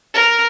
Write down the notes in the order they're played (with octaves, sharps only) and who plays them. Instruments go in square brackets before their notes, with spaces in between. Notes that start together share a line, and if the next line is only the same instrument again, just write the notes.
[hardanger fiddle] A#4